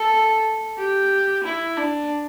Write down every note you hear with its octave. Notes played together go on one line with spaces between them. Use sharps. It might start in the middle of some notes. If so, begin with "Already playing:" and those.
Already playing: A4
G4
E4
D4